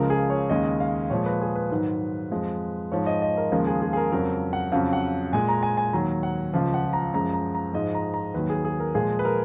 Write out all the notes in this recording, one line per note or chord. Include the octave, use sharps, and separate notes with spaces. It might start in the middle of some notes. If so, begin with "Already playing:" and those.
Already playing: C#2 C#3 F3 G#3 A#4
G#4
C#5
D#2 C#3 G#3 D#5
F5
A#2 F3 G#3 C#5
B4
G#4
B4
G#2 D#3 F#3
F2 F3 G#3
G#2 F3 G#3 C#5
D#5
D#5
A#4
D#2 C#3 F3 G#3 A#4
G#4
G#4
G#4
A#4
F2 C#3 F#3 A#4
F#5
F2 C#3 F#3 F5
F#5
A#2 G#3 G#5
A#5
G#5
G#5
D#2 D#3 F#3 A#5
F#5
C#2 C#3 F3 F5
F#5
A#5
F#2 F3 G#3 A#5
A#5
A#5
G#2 F3 G#3 D#5
A#5
A#5
D#2 D#3 F#3 B4
G#4
G#4
A#4
A#2 F3 G#3 G#4
B4
A#4